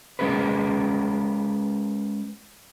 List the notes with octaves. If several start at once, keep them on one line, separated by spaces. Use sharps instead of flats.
G#3 C#4 G#4 A#4 B4